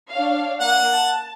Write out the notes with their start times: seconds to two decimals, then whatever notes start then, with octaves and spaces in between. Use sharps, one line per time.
0.11 D4 C#5 F5
0.60 A#3 F#5
0.93 A5